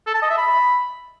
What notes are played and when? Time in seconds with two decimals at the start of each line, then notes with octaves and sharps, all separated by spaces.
0.07 A4
0.14 A5
0.22 D#5
0.30 E5
0.38 B5